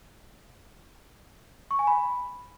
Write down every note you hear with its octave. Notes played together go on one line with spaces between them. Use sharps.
C#6
G#5
B5